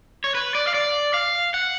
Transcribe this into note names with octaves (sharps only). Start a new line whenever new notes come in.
C#5
B4
D5
F5
D5
F5
F#5